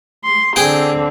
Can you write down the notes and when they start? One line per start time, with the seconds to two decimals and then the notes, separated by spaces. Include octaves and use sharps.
0.24 C6
0.56 D3 C4 G#4 G5